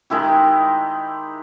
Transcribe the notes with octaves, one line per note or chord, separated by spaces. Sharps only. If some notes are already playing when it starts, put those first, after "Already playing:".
D#3 G#3 E4 G4